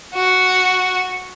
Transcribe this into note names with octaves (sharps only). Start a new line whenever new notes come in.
F#4